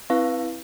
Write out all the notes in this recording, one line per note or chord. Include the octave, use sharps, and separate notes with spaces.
C4 E4 B4 F5